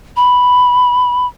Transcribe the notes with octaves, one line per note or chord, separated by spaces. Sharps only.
B5